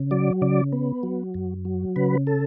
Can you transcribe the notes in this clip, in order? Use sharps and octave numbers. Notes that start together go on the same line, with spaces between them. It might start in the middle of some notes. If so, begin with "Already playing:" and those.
Already playing: C#3
F#3 D5
C#3 D5
B3
F#3
F#2
F#3
C#3 B4
A4